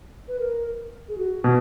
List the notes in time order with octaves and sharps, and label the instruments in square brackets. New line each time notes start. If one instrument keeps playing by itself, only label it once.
[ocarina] B4
A#4
G#4
F#4
[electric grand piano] B2